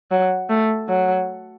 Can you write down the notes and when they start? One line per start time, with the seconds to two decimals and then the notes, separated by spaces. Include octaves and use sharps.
0.11 F#3
0.49 A3
0.88 F#3